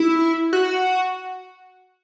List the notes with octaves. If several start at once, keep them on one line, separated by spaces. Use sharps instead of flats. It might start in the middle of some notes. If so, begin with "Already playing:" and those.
Already playing: E4
F#4